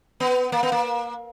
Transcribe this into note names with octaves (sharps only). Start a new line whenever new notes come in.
B3
A#3
B3
A#3